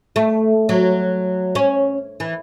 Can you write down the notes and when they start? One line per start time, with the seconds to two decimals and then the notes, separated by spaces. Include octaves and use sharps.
0.16 A3
0.69 F#3
1.55 C#4
2.20 E3